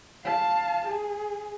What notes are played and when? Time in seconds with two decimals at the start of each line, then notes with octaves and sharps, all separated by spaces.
0.24 F5 A5
0.86 G#4